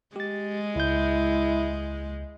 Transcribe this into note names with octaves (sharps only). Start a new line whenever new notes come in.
G#3 G4 A6
C#2 E4 G6